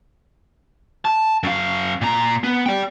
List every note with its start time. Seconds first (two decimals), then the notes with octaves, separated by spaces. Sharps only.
1.05 A5
1.43 F#2 F5
2.01 A#2 A#5
2.44 B3
2.66 D5 G5